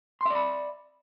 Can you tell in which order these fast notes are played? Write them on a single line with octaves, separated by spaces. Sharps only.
C6 E5 D5 B5